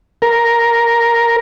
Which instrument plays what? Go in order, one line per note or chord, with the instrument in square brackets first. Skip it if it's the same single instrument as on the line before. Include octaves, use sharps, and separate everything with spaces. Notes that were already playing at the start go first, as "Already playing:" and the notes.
[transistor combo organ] A#4